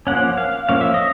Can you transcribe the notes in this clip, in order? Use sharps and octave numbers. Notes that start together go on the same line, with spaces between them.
F3 A#3 C#4 F#5
F5
F3 A#3 C#4 F5
E5
D#5